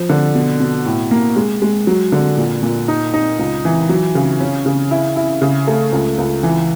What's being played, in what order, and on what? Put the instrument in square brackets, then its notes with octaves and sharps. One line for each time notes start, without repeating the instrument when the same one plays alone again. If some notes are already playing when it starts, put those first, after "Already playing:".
Already playing: [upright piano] F3
D3
B2
B2
A2
A#3
G#3
G#3
F#3
D3
A#2
A#2
D#4
D#4
C#2
E3
F#3
C#3
C#4
C#3
E4
E4
C#3
A3
C#2
C#2
E3